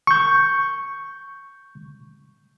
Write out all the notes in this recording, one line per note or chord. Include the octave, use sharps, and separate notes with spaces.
C#6 G6